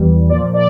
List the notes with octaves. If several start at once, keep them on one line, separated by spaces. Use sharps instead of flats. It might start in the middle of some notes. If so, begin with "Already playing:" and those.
Already playing: E2 E3 G3
A#2 F3 D5
D5